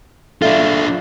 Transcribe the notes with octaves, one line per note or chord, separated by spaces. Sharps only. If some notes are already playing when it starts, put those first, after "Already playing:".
D4 F4 A4 E5